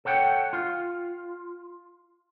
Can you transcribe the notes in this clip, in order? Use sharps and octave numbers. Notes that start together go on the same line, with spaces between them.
A4 C#5 F#5 G5
F4